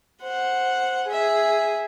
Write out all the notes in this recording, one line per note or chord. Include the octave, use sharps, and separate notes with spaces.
C5 F#5
G#4 E5